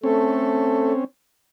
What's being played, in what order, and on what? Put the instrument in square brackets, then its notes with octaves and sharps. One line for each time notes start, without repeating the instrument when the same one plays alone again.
[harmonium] A3 A4 [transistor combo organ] C4 C#4